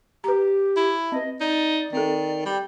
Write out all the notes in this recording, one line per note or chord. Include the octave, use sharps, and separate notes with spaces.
G4 B4 A#5
E4
C4 B4 D#5
D#4 D5
D#3 C4 A4
G3